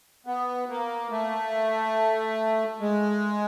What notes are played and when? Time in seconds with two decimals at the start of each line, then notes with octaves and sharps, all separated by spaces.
0.26 B3
0.69 A#3
1.11 A3
2.80 G#3